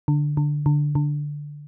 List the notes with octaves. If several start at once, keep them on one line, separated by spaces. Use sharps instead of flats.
D3
D3
D3
D3